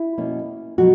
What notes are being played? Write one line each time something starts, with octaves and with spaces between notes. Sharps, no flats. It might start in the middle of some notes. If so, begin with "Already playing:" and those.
Already playing: E4
B2 A#3 C#4
B2 F#3 F#4